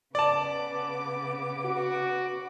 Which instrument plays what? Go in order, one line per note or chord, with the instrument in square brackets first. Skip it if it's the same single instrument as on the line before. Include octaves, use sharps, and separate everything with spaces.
[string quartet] C#3 B3 D6 [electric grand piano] D5 A5
[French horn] F#4